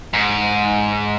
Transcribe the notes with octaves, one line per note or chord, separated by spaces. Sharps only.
G#2